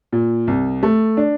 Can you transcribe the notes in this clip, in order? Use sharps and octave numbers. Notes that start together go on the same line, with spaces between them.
A#2
C2
A3
D4